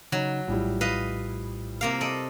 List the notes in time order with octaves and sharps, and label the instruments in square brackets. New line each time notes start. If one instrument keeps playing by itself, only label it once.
[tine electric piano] C#3 D#4 [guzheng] F#3
[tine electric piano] A#1 A2 [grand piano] F3 G3 E4
[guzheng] B4 D#5 F5
C3 A#3 F5
A4 D5 D#5